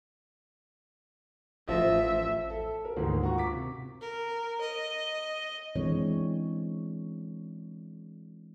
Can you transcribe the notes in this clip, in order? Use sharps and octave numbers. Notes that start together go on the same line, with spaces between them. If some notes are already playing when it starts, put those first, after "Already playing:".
A1 F3 D#5 E5
A4
A#4
D2 G#2 D#3 G#3 A#3
F4 F#4 F#5 A#5 C#6
D6 B6
C3
A#4
D#5
E3 G#3 C4 D4 C#5